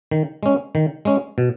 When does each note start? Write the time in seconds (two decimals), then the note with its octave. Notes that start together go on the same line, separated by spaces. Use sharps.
0.11 D#3
0.43 G#3 C#4
0.75 D#3
1.05 G#3 C#4
1.38 B2